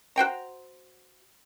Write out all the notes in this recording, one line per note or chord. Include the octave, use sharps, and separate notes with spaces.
F#4 C5 G5 A#5